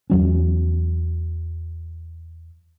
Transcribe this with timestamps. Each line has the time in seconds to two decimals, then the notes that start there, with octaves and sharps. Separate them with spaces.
0.10 E2 F#3 C#4